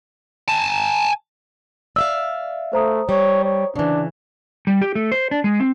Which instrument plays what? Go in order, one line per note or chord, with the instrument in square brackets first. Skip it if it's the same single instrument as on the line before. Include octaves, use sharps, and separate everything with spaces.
[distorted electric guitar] G#5 A5
[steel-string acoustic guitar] D5 E5 F5 [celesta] E6
[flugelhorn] A3 [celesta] C5 A#5 D#6
[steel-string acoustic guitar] G3 [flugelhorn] C#5
[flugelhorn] C#5
[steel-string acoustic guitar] C#3 E3 [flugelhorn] D4
[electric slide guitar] G3
G4
A3
C5
D4
G#3
C4